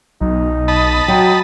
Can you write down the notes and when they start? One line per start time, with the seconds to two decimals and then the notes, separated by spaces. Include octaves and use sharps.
0.21 B1 D#4
0.68 D#5 A5 B5
1.08 F#3 G5